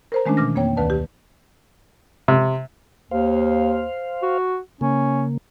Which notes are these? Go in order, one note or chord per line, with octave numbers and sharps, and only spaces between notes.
A#4 C5 A#5
D#3 G#3 A3 C#4 D4
B2 E3 D6 F6 A#6
F2 A#3 C4 C#5 G5
D2 D#3 B4 D5 A5
G4
C3
D#2 C5 F5
F#4
C#3 A#3 C#4